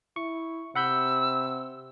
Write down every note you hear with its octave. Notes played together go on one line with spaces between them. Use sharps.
E4 C#6
C3 F#5 B5 E6 G6